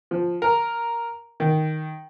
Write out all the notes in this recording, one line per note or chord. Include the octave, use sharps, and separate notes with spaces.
F3
A#4
D#3